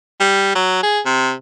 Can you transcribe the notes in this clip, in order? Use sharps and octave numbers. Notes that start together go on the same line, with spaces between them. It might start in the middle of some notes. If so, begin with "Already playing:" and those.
G3
F#3
G#4
C3